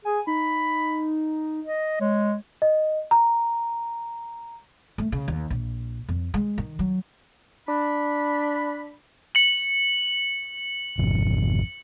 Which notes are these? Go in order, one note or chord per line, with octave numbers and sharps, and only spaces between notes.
G#4 G#5
D#4 B5
D#5
G#3 C#5
D#5
A#5
A3
C#3
D#2
A#1
F2
G#3
D#3
F#3
D4 B5
C#7 F#7
G#1 F2 C3